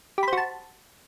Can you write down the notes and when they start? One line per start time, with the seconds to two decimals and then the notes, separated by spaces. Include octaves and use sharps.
0.18 G4
0.23 B5
0.28 C5
0.33 F#4
0.37 A5